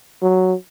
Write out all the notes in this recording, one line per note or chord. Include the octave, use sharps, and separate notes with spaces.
F#3